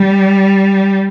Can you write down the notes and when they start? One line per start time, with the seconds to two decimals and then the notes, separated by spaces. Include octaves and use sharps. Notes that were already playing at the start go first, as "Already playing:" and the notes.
Already playing: G3